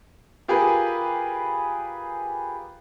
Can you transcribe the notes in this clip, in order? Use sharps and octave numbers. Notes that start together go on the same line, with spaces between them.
F4 G4 G#4 A#4 B4